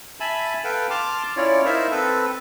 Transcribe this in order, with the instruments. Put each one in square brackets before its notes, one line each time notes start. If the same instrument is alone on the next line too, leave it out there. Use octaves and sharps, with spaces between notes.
[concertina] E5 G#5 A5 B5
A4 B4 F5 G5
A5 C6 D6 F6
C#4 E4 F4 C#5 D5
D#4 E4 A#4 C5 E5 F5
C4 A4 B4